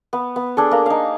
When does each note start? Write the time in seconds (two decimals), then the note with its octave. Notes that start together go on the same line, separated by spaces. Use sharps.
0.13 B3
0.36 B3
0.57 D4 G#4 A4
0.71 A#3 A#5
0.86 D#4 F5